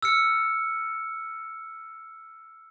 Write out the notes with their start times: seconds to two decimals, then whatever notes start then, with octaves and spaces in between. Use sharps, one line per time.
0.02 E6 F6 C#7